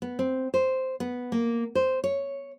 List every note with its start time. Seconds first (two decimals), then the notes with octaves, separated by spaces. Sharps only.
0.02 B3
0.19 C4
0.54 C5
1.00 B3
1.32 A#3
1.75 C5
2.04 C#5